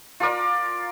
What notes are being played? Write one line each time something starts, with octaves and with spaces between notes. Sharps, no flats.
F4 A#4 D5